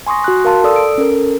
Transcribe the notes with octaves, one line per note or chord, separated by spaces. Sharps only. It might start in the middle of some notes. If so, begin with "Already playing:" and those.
G#5 C6 C#6 D#6 A#6
F#4 F#6
A#4 F5 A5 C6
A4 D5 D#6 E6
D7
C#4 A4 A#4